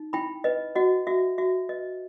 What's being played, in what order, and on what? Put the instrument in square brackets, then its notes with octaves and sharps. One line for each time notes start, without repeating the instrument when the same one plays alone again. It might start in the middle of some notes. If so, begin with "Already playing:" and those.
Already playing: [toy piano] D#4
E4 G5 B5
B4 D#5
F#4 D#5 F#5
F#4 E5
F#4 E5
B4 D#5